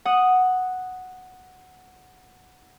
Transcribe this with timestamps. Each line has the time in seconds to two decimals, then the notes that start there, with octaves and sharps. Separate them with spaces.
0.05 F#5 D#6